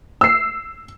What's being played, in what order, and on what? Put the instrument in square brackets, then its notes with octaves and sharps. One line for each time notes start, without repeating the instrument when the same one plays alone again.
[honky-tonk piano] E6 C7